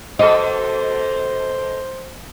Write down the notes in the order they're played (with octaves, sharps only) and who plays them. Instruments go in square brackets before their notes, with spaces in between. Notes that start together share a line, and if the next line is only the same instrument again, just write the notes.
[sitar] B2 A4 [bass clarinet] C5 [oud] D#5